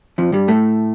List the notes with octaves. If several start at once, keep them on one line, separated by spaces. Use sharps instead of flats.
F2 F3
G2 G3
A2 A3